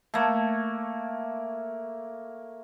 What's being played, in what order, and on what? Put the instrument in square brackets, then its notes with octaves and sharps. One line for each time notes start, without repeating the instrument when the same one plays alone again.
[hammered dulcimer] A3 A#3